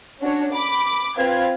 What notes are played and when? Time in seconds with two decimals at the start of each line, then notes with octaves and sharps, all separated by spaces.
0.20 C#4 D4 F#4 C#5
0.53 B5 D6
1.17 C4 F4 B4 F5 G#6